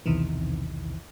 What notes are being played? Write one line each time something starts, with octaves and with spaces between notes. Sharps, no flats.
B1 E2 C3 D#3 E3